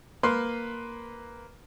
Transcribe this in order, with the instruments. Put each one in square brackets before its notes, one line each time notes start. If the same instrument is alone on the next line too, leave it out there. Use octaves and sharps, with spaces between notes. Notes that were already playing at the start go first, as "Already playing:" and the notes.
[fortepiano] A#3 B4 C6